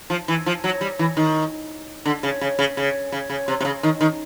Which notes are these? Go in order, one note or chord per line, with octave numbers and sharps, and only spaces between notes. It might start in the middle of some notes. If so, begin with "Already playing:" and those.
F3
E3
F3
F#3
G3
E3
D#3
D3
C#3
C#3
C#3
C#3
C#3
C#3
C3
C3
C#3
D#3
D#3